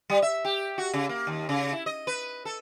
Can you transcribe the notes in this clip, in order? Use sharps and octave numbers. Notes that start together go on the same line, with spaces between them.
G3
E5
G4
F#4
C#3
A#3
D#2
C#3
E4
D#5
B4
A4